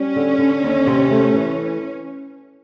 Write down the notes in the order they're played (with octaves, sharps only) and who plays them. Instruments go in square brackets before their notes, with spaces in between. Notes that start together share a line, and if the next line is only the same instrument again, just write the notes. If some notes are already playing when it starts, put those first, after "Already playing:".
Already playing: [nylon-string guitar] G3 [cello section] C#4
[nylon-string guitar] D3
D3
D#2
C3
A3
E3